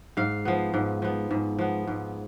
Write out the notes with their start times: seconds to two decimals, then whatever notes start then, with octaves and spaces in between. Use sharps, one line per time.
0.17 G#2 F5
0.45 F3 B3
0.74 G#2
1.02 F3 B3
1.31 G#2
1.59 F3 B3
1.87 G#2